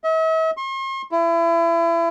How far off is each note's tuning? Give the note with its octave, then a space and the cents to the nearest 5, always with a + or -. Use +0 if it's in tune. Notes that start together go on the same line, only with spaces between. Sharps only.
E5 -45
C6 +45
E4 +30